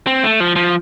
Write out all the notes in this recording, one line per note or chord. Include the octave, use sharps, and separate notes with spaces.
C4
A3
F3
F3